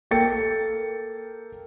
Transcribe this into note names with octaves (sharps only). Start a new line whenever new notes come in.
A#3 A4 G5 A6 C#7